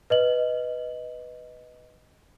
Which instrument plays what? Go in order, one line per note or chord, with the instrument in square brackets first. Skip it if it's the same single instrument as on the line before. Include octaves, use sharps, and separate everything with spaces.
[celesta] B4 D#5 F#7